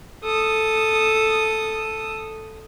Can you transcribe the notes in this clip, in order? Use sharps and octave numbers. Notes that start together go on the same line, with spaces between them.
A4 D#6